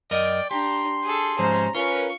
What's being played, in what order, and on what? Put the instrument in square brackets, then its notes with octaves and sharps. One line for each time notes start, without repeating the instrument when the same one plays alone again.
[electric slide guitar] F#2 A#4 D#5 [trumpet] D5 [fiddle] G5
[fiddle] D4 A#5 [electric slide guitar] G4 [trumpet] C6
[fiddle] G#4 A4
[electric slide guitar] G#2 F3 [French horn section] C3 C#4 C5 [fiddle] A#5
[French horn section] C#4 A#4 B4 [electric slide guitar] F4 [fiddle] C#6